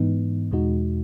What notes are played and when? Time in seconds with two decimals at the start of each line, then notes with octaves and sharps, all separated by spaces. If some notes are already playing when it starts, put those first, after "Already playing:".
Already playing: G#2 E3 B3 D#4
0.51 E2 B2 G#3 D#4 F#4